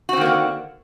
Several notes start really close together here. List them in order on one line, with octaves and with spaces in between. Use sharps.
F#4 C4 D#3 A#3 D3